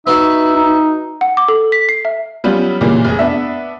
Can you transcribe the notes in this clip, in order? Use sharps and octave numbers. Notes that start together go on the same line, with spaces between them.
B3 D#4 F#4 E5
D#4
F#5
D6
A4
B6
C7
E5
F#3 G3 B3 C#4 F4
A#2 C#3 E3 G3 A#3
F1 G#4
B3 D4 E5